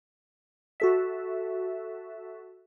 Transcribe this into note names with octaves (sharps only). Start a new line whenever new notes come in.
F#4 A4 E5